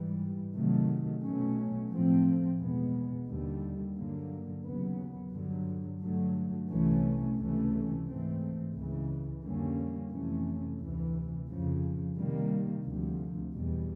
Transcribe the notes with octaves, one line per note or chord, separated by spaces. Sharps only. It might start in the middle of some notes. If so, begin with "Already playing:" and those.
Already playing: G#2 E3 G3
C3 D#3 F#3 A3
B2 F#3 A3 C#4
A2 F3 A3 C4
E2 B2 G#3 B3
D#2 D3 G3
G2 D3 F#3 A#3
D#2 C#3 F#3 B3
G2 D3 F#3
G2 D3 F#3 A3
C2 C3 E3 A3 C#4
C#2 C3 E3 A3 C#4
G#2 E3 A3 C4
C#2 C#3 E3
F2 D3 G3 A#3 C#4
F2 C3 E3 A3 C#4
D2 C3 E3
F2 C#3 F3
C3 D#3 G3 A#3
D2 C3 F3
E2 B2 G3